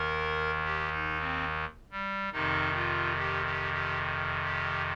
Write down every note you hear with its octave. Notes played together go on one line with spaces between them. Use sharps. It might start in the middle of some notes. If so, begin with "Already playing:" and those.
Already playing: D#2 D#3 A#4
G4
D#4
C4
G3
F2 C3 D#3 D#4
F4
G4
G4
G4
G4